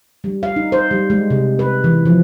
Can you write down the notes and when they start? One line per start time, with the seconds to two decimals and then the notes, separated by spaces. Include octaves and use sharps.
0.24 G3
0.43 F5
0.56 D#4
0.72 C5
0.91 G3
1.10 G#3
1.30 C3
1.59 B4
1.84 E3
2.06 F3